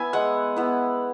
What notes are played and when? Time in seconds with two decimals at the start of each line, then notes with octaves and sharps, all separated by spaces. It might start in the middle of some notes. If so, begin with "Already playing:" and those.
Already playing: B3 E4 E5 G#5
0.13 G#3 F#5
0.56 B3 E4